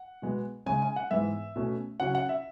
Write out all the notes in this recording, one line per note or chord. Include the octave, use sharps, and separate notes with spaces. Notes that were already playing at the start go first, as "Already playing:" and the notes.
Already playing: F#5
B2 G#3 B3
C#3 G#3 C#4 G#5
G#5
F#5
G#2 E3 G#3 B3 E5
B2 A3 C#4
C#3 F#3 C#4 F#5
F#5
E5